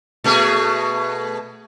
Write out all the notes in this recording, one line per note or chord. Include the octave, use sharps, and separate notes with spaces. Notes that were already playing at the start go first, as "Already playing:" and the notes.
B2 A3 G#4